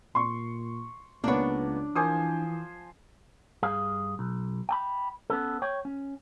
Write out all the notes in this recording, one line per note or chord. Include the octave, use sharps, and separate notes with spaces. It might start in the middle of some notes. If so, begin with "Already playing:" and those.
A#2 C6 C#6
C#2 A#3 B3 D4 C#5
E3 F3 A#4 C5 G#5 D6 D#6
G2 G#4 F5
B1
G5 A5 B5
B3 C#4 A4
C#5 G5
C#4